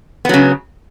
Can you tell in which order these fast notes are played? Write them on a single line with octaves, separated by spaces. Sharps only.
B3 F#3 C#3